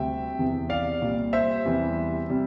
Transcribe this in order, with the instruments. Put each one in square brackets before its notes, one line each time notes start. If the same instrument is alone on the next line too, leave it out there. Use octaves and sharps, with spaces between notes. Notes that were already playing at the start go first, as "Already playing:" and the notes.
Already playing: [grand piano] D2 C3 G3 E5 G5
E2 C3 E3
D5 F5
C2 A#2 G3
C5 E5
E2 C3 E3 G3
C3 G3